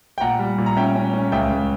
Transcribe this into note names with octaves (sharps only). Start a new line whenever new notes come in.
G5
A#2 F#5 A#5
G3
A#2
A#5
C#4 E5 G5
C#4
C#4
C#2 E5 G5
C#2